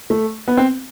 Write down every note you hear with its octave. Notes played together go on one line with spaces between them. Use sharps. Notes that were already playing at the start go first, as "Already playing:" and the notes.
A3
B3
C4